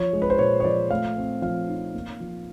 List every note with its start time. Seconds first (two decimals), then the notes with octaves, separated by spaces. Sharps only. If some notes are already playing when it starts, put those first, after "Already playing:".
Already playing: F3 C#5
0.13 G#3
0.22 B4
0.30 C5
0.39 A#2 C#5
0.60 C#5
0.64 F3 D5
0.90 A3 F5
1.17 C4
1.42 F3 F5
1.68 D#4
1.94 A#3
2.20 F3